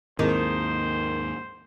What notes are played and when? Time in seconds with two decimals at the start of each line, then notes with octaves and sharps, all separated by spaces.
0.19 D#2 G#2 D#3 C4 E4 G#4 C5